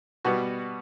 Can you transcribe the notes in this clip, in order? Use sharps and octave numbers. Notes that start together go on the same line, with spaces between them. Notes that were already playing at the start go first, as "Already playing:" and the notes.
B2 G3 B3 F#4